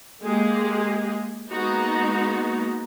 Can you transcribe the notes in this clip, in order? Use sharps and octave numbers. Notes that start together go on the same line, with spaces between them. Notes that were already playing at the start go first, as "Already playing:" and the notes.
G#3 A#3 G4 G#4
G#3 A#3 B3 D#4 F#4